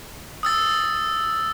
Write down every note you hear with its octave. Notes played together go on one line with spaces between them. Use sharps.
D#6 E6 A6